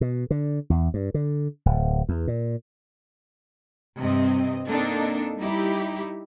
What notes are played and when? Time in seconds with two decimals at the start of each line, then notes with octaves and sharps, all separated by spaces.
0.01 B2
0.31 D3
0.70 E2
0.94 G2
1.14 D3
1.66 D1
2.09 E2
2.27 A#2
4.01 G2 C3 C4 D#5
4.69 A#3 C4 D4 D#4 A4
5.40 G3 D#4 E4 G4